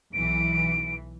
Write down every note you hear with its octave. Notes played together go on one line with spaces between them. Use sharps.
B1 E3 D7